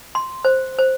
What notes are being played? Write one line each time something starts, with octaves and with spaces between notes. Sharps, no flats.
C6
C5
C5